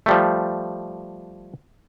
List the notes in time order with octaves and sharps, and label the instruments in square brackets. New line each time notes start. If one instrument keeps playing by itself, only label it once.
[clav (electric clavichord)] F3 G3 A3